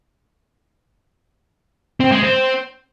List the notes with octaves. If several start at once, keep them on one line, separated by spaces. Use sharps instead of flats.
C4
G#3
C4